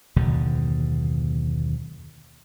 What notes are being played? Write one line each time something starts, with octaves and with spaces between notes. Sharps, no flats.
F#1 D#2 B2 D3